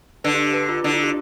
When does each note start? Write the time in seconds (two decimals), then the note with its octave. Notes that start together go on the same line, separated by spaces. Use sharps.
0.24 D3 B4
0.34 G4
0.53 B4
0.69 F4
0.84 D3 E4
0.93 F4
1.03 G4